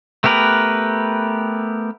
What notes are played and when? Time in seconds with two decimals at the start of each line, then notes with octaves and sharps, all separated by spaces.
0.24 A3 B3 G4 A#4 B4